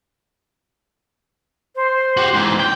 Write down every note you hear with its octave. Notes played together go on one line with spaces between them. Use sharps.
C5
F#4 G4
G#2 E3
G5